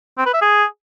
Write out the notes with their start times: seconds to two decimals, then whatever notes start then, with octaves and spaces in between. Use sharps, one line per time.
0.18 C4
0.26 B4
0.34 E5
0.41 G#4